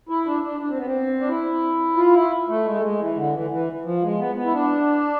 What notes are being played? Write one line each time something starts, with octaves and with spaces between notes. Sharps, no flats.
E4
D4
D4
D4
C4
B3
C4
D4
E4
F4
E4
A3
G#3
A3
G#3
E3
D3
E3
E3
F3
G#3
B3
B3
E4
D4